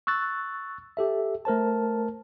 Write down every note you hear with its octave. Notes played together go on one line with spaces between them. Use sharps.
C#6 E6 F#6 A6
G4 A4 E5
A3 A#4 C5 A5